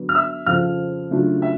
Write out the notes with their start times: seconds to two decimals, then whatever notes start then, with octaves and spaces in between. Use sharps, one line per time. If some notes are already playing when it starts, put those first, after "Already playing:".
Already playing: D3 F#3 B3
0.09 F6
0.15 E5 E6
0.46 F2 C#3 F3 F5 F6
1.11 C#3 F#3 A3 D4 F4
1.42 E5